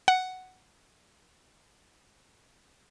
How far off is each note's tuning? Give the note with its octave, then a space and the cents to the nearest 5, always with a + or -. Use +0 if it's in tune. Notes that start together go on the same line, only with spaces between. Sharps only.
F#5 +5